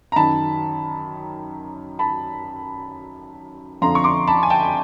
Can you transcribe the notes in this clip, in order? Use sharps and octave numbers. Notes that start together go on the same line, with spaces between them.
A#5
F#2 D#3 A5 B5
A5 B5
F2 D3 F3 A#5 C6
C#6
C6 D6
A5 B5
G#5
G5 A5